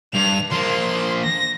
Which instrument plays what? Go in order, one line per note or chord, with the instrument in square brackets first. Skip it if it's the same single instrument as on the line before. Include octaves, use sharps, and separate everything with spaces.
[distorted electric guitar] G2 [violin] F7
[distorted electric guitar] F3 A#3 [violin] C6
[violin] A#6